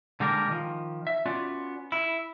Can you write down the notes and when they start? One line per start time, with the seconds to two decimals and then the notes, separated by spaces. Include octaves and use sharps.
0.20 D3 G3 G#3 A#3 A#4
0.48 D#3 F3
1.07 E5
1.26 B3 C#4 F4 F#4 D5
1.92 E4